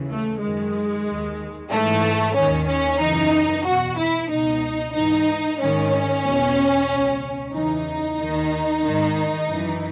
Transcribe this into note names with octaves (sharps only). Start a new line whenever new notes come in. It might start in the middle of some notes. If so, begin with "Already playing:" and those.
Already playing: D#2 C#3 E3
A3
F#2 D#3 G#3
D#2 D#3
G#2 E3 A3
D#2 D#3 C#4
C#4
F#2 C#3 E3 D#4
E2 B2 F#4
E4
C#2 B2 D#4
G#2 E3 D#4
G#2 D#3 C#4
E2 B2
C#2 B2
E2 C#3 E3 D#4
D#2 D#3
G#2 D#3
F#2 E3